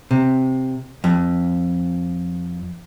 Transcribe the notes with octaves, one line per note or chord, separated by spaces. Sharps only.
C3
F2